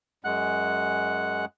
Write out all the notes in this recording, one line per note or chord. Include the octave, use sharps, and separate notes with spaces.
F#2 G#3 F#5 F#6